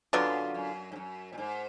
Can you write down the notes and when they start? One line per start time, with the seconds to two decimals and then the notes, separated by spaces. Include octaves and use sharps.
0.13 F#2 D3 F#3 B3 F4
0.54 F#2
0.92 G#2
0.96 F#2
1.33 A#2
1.38 G#2